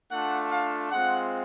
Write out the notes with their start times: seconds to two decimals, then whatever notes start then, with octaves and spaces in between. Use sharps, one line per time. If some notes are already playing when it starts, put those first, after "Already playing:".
0.11 A3 D4 F4 F#5
0.51 F5
0.91 G#3 C4 F4 F#5